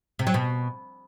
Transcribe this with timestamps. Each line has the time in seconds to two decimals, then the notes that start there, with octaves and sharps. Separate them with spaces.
0.19 C3
0.27 F#3
0.34 B2